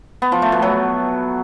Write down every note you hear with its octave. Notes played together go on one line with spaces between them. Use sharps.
B3
F3
A3
B2
F#3